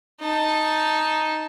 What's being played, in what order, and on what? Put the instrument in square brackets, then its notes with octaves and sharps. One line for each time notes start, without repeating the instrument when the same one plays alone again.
[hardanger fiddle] D#4 A5